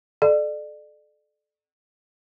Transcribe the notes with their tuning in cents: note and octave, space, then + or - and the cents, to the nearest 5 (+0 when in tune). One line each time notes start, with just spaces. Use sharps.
A4 -25 D5 +30